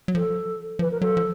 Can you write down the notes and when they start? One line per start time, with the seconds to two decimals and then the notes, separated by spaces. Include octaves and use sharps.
0.08 F#3
0.15 F3 A4
0.79 F3 B4
0.91 A#4
1.01 F#3 A4
1.17 F3